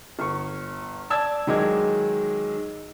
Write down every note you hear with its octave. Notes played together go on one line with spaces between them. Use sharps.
G1 C#6
D5 A5 E6 G#6
D#3 F#3 G#3 D#5 D6 G#6